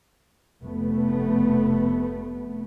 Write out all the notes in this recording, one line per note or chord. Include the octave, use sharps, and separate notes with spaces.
F1 A3 B3